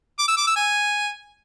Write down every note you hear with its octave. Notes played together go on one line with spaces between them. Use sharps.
D6
E6
D6
E6
G#5